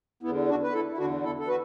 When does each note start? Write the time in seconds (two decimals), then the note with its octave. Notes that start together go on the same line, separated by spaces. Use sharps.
0.23 E2 B3 E4
0.28 D3
0.48 D4 F#4
0.63 B4
0.73 E4 A4
0.92 E4
0.98 D3 D4 F#4
1.01 E2
1.23 E4 A4
1.40 A4
1.48 F#4 B4